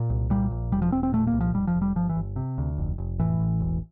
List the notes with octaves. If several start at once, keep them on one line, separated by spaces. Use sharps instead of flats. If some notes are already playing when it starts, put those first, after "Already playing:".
Already playing: A#2
C2
A#2 G3
A#1
E1 G3
F3
E1 C4
C4
A#2 A3
A#3
C2
F3
F1 G3
F3
F1
G3
G1 F3
E3
G1
C3
D2
F1
F1
A2 E3
A1
E1